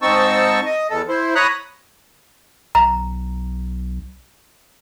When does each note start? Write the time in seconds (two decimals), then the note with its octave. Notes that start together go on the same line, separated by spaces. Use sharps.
0.02 G#2 C4 D#4 A5 C#6 E6
0.66 D#5
0.90 E2 A4
1.09 E4 C5
1.35 C#5 A#5 B5 D#6 F#6
2.75 B1 A#5